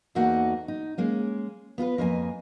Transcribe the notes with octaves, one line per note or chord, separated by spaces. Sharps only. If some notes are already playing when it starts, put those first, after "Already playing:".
E2 A3 A#3 D#4 F#4 F#5
D#4
G#3 A#3 C#4
B3 F4 G#4 B4
F2 A#3 D#5 G#5